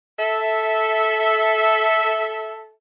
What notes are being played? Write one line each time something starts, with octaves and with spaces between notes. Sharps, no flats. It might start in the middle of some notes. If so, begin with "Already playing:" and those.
A4 E5